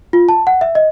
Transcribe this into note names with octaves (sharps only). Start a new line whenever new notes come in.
F4
A5
F#5
E5
D#5